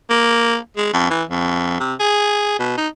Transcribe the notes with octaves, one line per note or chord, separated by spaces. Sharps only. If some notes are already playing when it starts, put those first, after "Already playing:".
A#3
G#3
F2
E3
F2
C3
G#4
B2
D#4